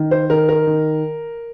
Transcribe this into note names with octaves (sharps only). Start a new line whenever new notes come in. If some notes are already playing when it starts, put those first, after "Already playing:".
Already playing: D#3
C5
D#3 A#4
A#4
D#3